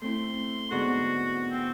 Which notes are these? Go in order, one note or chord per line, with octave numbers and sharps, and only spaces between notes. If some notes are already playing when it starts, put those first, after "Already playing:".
A3 C4 E4 C6
G#2 D3 B3 F#4
C4